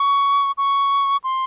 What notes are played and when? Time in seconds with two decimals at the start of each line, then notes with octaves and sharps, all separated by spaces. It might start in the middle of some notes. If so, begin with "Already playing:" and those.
Already playing: C#6
0.58 C#6
1.24 C6